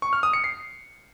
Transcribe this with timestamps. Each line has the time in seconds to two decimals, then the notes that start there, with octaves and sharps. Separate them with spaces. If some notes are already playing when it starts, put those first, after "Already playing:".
0.02 C#6
0.13 F6
0.23 D#6
0.33 C#7
0.44 C7